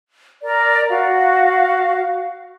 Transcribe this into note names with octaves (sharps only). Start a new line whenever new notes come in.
A#4 D5 A#5
F#4 F5